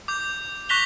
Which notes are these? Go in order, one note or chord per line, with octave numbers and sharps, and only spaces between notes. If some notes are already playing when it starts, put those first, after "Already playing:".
D6 G6
C#6 F#6 A#6 B6 F7 G7